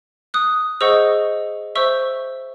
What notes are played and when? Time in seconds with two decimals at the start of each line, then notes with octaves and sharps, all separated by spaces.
0.34 D#6 F#6
0.81 G#4 C5 D#5 F#5 C#6 E6
1.75 C5 E5 C#6 E6